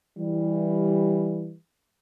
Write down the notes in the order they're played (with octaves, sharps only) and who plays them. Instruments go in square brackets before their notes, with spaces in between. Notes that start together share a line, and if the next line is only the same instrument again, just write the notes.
[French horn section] E3 G3